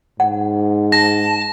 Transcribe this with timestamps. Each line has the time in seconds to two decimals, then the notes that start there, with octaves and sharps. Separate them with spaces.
0.20 G#2 F#5
0.92 A5 A#6